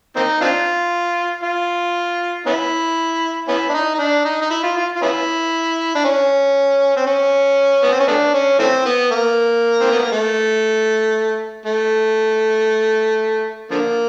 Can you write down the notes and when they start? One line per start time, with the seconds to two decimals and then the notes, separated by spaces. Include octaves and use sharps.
0.16 A#3 C4 D#4
0.41 C4 D4 F4
1.43 F4
2.46 B3 C#4 E4
3.48 B3 C#4 E4
3.69 D4
3.74 D#4
3.95 D#4
3.99 D4
4.25 D#4
4.42 D#4
4.50 E4
4.63 F4
4.76 F4
4.96 F4
5.02 B3 C#4 E4
5.95 D4
6.04 C#4
6.97 C4
7.06 C#4
7.83 B3
7.92 C4
8.00 C#4
8.08 A3 B3 D4
8.34 C#4
8.59 E3 A3 C4
8.85 B3
9.11 A#3
9.81 C4
9.91 B3
10.02 A#3
10.12 A3
11.66 A3
13.71 D3 F3 A#3